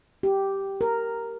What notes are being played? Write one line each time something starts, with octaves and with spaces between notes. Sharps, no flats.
G4
A#4